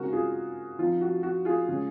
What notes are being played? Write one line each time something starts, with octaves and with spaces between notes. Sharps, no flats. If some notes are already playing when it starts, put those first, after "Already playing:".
Already playing: C#3 G#3 C4 D#4 F#4 A#4
F4 G#4
F3 C4 D#4 F4
F#4
F#4
F4 G#4
C#3 G#3 C#4